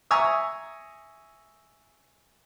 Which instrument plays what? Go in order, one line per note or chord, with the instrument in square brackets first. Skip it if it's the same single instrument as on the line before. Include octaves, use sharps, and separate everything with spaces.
[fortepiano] E5 G#5 A#5 C#6 D#6 E6